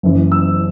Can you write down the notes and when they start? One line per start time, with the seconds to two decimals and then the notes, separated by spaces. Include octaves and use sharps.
0.03 F#1 F#2 E3
0.32 E6